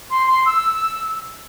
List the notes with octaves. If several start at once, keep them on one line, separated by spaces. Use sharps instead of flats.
C6
C6
E6